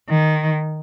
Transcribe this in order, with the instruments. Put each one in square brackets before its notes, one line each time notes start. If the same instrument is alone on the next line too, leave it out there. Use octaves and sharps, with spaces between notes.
[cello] D#3